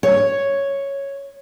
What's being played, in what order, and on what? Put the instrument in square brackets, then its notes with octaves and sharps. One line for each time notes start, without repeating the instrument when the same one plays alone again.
[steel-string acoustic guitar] C#5